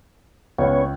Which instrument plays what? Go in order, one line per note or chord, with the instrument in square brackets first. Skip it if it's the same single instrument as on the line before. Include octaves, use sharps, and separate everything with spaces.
[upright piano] C#2 [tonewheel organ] B3 C#4 C#5